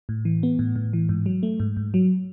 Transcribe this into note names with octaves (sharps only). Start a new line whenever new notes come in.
A2
E3
B3
A2
A2
E3
G#2
F#3
A3
G#2
G#2
F#3